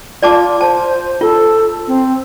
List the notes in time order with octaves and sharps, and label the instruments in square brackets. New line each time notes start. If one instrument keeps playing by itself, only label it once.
[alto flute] F4 [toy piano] D5 A5 D6
[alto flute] C5 [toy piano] A5
[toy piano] F4 [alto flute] A4
[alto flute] C4